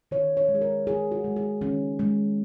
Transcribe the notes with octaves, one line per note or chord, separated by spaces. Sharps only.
D#3 C#5
C#5
G#3
G#4
A#4
D#3 G#4
F#4
G#3
G#4
D#3 C#4
G#3